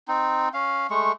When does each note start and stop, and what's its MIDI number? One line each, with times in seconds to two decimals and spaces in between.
0.08 0.49 60
0.08 0.49 63
0.54 0.87 61
0.54 0.87 77
0.90 1.12 56
0.90 1.12 57
0.90 1.12 85